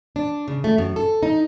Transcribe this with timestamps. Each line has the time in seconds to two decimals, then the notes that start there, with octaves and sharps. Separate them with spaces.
0.16 D4
0.48 C#3
0.64 A3
0.78 F#2
0.96 A4
1.23 D#4